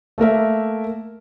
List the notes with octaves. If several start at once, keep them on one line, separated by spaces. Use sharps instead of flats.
A3 A#3 A#4 E5